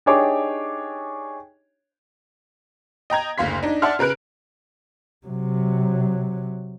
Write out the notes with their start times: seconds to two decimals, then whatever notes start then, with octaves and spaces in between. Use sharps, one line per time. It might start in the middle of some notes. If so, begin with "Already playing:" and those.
0.06 D4 D#4 G4 G#4 C#5 D6
3.10 D#5 G5 A#5 G#6
3.38 F#1 D2 F5 C6 B6
3.63 D4 D#4
3.82 D5 E5 F#5 A5 C6 F6
3.99 C#3 A#4 B4 F#6 D7
5.26 C3 F#3